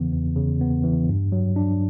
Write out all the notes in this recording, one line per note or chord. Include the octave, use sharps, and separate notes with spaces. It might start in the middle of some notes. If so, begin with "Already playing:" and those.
Already playing: E2 C#3 E3 B3
E2
C#3
B3
E3
G2
F#3
D4